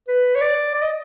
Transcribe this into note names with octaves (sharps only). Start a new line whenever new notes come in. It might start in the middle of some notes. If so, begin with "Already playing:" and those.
B4
C#5
D5
D5
D#5